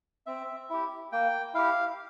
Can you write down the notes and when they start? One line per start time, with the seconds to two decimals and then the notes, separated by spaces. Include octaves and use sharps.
0.26 C4 E5
0.70 E4 G4
1.12 A#3 G5
1.54 E4 G4 F5